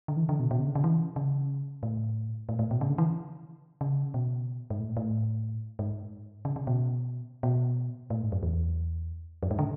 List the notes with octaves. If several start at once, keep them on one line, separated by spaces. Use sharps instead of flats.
D3
E3
D3
B2
B2
C#3
D3
C#3
E3
C#3
A2
A2
A2
B2
C#3
D3
E3
C#3
B2
G#2
A2
A2
G#2
C#3
C#3
B2
B2
A2
G#2
F#2
E2
F#2
G#2
D3